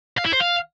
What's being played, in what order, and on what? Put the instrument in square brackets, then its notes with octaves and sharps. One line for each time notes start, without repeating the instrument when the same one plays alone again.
[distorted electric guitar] F5
E4
C5
F5